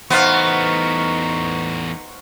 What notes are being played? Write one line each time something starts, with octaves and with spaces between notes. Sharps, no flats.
E2 A3 B3 D#4 F#4 C5 F5 C#6